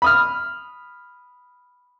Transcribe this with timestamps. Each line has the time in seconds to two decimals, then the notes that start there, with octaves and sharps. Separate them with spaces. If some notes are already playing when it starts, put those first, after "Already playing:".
0.02 B5 D#6 F6